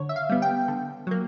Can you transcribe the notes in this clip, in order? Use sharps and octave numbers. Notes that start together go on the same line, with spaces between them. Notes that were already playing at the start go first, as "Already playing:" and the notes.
Already playing: D3 C#5
E5
F5
G3 B3
G5
D3
F#3 A#3